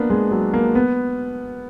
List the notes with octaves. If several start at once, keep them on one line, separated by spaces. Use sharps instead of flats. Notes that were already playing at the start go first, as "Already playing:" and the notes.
Already playing: A#3 B3 D4
G#3
F#3
A#3
B3